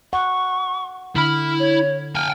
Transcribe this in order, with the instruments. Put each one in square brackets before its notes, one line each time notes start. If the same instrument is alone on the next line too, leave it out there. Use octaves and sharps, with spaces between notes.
[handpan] F#5 [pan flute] C#6
[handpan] D3 [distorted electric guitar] E4 B5 [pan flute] F6
[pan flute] C#5
[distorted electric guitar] G5 G#5 [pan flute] F6